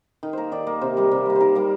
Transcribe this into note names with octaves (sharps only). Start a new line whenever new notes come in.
D#3
A#3 A#4 C5
D#3 D5
A#3
C3 C5
G3 A#3
C3
G3 A#3
C5
D#3 A#4
G3 A#3